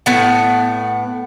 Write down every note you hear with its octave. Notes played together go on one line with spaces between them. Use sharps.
A2 B3 F#5